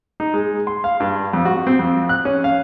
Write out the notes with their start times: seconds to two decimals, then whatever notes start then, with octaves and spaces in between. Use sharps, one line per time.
0.20 D#4
0.34 G#3
0.67 C6
0.84 F5
1.00 G2
1.33 F2
1.45 F#4
1.67 C4
1.79 F2
2.09 F#6
2.25 C#4
2.44 F5